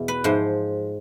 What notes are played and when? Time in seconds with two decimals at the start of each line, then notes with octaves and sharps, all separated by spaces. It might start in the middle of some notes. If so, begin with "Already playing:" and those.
Already playing: E2 B2
0.08 B4
0.24 G#2 F3 C5